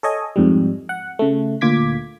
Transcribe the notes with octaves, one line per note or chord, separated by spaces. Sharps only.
A4 C#5 D#5 G#5
F2 G#2 G3
F#5
C#3 A3
D2 A#2 F4 D6 G#6 B6